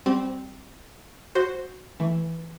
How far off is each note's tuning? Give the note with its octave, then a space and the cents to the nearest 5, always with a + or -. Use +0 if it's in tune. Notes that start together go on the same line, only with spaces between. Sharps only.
G3 +0 C4 +0 G4 -40
F#4 +0 C5 +0
E3 +0 A3 +0